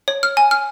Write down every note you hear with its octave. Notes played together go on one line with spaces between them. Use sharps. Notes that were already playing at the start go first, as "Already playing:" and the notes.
C#5
F6
G#5
F6